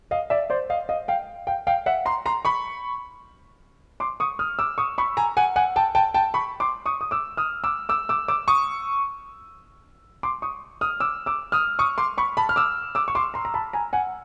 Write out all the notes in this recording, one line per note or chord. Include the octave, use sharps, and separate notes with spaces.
D#5 F5
D5 E5
C5 D5
D#5 F5
D#5 F5
F5 G5
F5 G5
F5 G5
E5 F#5
A#5 C6
A#5 C6
B5 C#6
C6 D6
C#6 D#6
D#6 F6
D6 E6
C#6 D#6
B5 C#6
G#5 A#5
F#5 G#5
F#5 G#5
G5 A5
G5 A5
G5 A5
B5 C#6
C6 D6
C#6 D#6
D#6
D6 E6
D#6 F6
D6 E6
D6 E6
D6 E6
D6 E6
C#6 D#6
C6 D6
C#6 D#6
D#6 F6
D6 E6
D6 E6
D#6 F6
C#6 D#6
C6 D6
B5 C#6
A5 B5
F6
D6 E6
D6 E6
C#6
C6 D6
A#5 C6
A#5
A5 B5
G#5 A#5
F#5 G#5